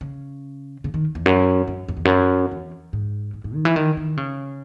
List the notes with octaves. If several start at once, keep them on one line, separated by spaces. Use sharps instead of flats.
C#3
C#3
D#3
E2
F#2
F#2
F#2
E2
F#2
E2
G#2
G#2
G#2
D#3
E3
D#3
D#3
C#3